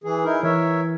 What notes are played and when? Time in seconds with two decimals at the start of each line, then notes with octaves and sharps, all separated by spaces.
0.04 E3 G#4
0.25 D#4 E4 A#4
0.43 E3 A#4 C#5 E5